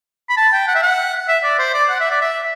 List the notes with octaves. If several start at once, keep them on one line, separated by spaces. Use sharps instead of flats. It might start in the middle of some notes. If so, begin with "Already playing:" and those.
B5
A5
G5
F#5
E5
F#5
E5
D5
C5
D5
F#5
E5
D5
E5